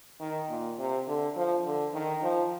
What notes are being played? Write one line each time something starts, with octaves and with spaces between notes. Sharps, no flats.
D#3
A#2
C3
D3
F3
D3
D#3
F3